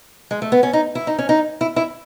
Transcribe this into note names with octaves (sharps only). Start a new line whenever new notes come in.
G#3
A3
B3
C#4
D#4
E4
D#4
C#4
D#4
E4
E4